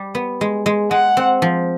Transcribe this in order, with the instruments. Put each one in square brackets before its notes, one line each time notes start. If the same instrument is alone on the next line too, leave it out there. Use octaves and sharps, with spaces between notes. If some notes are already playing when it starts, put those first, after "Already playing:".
Already playing: [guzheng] G3
B3
G#3
G#3
[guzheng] G#3 [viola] F#5
[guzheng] C4
F3